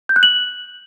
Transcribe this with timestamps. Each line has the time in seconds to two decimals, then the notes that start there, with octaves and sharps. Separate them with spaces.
0.09 G6
0.16 F#6
0.23 F#7